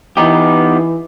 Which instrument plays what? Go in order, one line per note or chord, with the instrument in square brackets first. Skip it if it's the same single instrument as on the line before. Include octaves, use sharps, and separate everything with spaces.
[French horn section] E3 [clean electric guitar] B3 D#4 G4